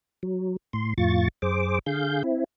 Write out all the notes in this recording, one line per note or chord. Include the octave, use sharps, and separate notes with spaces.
F#3
A2 C6
F2 A2 F4 C#6 A6
F#2 G#4 C5 D6
D3 G#4 F5 G6
C4 E4